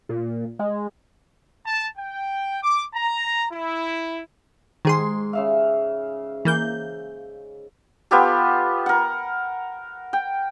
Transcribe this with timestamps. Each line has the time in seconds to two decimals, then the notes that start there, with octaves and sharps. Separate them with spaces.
0.09 A#2
0.59 G#3
1.65 A5
1.98 G5
2.63 D6
2.94 A#5
3.51 E4
4.85 G#2 D#3 G#4 C6
5.33 C#3 E5 F5
6.45 E3 A#3 G6
8.11 B3 F4 G4 A4
8.86 A#4 F#5
10.13 G5